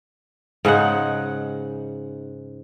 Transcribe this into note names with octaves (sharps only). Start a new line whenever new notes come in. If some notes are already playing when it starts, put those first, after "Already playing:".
G#2 C#3 D#4 F#5